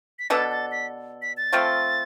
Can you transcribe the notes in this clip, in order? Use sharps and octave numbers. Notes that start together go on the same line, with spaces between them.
B6
B2 B3 D4 A4 A6
A6
B6
B6
A6
F3 A3 C4 F4